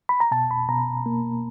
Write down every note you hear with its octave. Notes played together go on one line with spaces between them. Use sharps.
B5
A#5
B2 A5
B5
B2 A#5
A#3